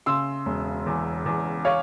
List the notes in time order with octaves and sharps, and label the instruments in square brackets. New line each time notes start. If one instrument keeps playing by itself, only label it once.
[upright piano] C#3 C6 E6
E1
E2
E2
C#5 F5